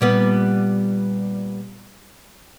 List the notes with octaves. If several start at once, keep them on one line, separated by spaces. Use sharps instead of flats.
A#2 G3 B3